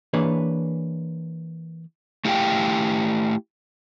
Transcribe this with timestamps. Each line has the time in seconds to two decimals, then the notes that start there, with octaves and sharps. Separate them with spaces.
0.13 E3 A#3 D4 G#4 B4 C#5
2.25 A3 E4 G4 E5 F5 G5